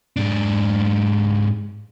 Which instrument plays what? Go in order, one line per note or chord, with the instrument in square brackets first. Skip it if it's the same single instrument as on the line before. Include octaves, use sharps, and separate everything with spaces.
[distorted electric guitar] G#2 D4